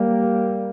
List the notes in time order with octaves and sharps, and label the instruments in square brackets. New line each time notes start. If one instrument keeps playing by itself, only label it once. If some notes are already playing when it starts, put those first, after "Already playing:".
Already playing: [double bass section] G3 A#3